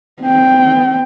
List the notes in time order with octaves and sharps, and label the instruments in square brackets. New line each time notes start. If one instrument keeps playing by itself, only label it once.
[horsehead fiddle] C4 G5